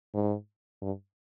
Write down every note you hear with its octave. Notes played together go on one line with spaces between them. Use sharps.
G#2
G2